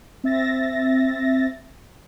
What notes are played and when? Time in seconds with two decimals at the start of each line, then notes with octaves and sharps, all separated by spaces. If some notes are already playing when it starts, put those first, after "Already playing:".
0.24 C4 E5 A6 A#6